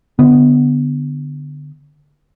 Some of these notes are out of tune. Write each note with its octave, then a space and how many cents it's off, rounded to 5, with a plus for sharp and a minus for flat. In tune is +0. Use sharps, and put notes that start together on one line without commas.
D3 +0 B3 +0